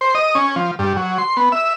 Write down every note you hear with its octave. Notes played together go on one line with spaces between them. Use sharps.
C5
D#5
C#4
F3
G2
F#3
C6
B3
E5